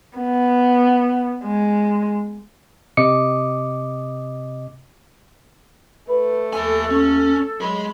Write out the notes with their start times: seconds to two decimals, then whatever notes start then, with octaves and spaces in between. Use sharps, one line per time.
0.17 B3
1.44 G#3
2.97 C3 D#5 D6 D#6 C#7
6.09 A3 B4
6.53 D#2 A4 E5 G#5
6.90 C#4
7.61 F#3 G#3 G#4 B5